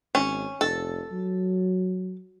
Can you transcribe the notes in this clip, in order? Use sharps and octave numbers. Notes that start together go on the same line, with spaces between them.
G#1 C#4
F1 A4
F#3